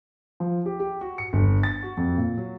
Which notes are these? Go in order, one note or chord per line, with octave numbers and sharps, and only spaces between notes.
F3
G4
G4
F#4
C#7
G1
A6
F#4
F2
A#2
F#3